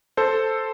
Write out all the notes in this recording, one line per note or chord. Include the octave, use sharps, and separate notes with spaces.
A4 C5